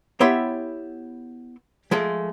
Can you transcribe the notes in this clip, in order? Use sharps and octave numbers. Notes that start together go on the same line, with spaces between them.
B3 E4 G4 C#5 E5 C6
F3 G#3 A3 A4